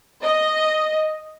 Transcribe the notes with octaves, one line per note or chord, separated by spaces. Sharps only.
D#5